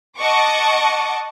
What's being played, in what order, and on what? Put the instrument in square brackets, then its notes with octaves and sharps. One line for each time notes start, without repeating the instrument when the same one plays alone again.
[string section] D#5 F#5 A5 C#6 D6